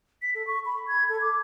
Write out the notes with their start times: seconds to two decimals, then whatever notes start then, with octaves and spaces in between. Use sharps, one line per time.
0.22 B6
0.35 A4
0.47 C#6
0.65 B5
0.88 G#6
1.09 A4
1.22 D6